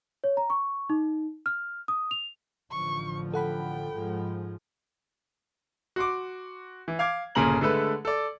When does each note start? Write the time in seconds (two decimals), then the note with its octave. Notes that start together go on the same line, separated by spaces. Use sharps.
0.24 C#5
0.37 A#5
0.50 C#6
0.90 D#4
1.46 F6
1.88 D#6
2.11 F7
2.71 A1 D3 F3 C#6
3.34 A4 F#5 G5 B5
3.94 G#2 F3 G#3
5.96 F#4 C6 D6
6.88 E3
6.99 F5 D6 G#6
7.35 G1 A#2 C#3 G#5 A#5 F#7
7.61 D3 G#3 A3 A4 B4
8.05 A4 D5